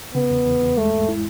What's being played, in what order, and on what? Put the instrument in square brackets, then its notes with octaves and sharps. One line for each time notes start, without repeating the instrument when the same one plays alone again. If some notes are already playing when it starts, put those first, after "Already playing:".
[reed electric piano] C#3 [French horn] B3
[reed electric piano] E2
E2
E2
[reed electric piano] G#3 [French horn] A3
[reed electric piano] G#2
E4